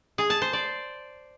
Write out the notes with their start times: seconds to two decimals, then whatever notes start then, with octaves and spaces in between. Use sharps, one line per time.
0.18 G#4
0.30 A5
0.42 C5
0.53 D5